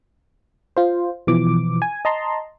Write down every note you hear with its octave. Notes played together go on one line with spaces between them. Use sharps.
F4 C5
B2 E3 F3 D6
G#5
D#5 A5 A#5 C6